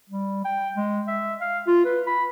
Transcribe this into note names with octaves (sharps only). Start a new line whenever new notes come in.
G3
G5
G#3
E5
F5
F4
B4
B5